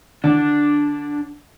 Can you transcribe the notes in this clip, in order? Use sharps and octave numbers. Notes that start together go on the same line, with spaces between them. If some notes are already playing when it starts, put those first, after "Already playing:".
D3 D4